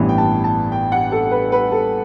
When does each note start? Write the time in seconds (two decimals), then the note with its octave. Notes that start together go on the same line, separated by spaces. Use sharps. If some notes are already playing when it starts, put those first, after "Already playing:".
Already playing: A1 G2 E3 B3
0.09 G5
0.18 A5
0.44 A5
0.72 G5
0.92 F#5
1.12 A4
1.31 B4
1.52 B4
1.72 A4